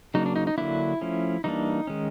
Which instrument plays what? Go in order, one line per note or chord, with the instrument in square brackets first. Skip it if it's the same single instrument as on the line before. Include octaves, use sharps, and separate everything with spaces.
[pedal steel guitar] C#3 F#3 A#3 D4 D#4
D4
D#4
D#4
D3 F#3 A#3 D4 E4
F3 A3 C#4
E3 G3 A#3 D4 D#4
D#3 G#3 C#4